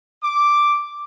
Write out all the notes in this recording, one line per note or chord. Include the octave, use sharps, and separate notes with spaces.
D6